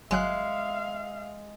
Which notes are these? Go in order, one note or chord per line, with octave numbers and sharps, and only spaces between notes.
G1 F#3 G#3 E5 F5 F#6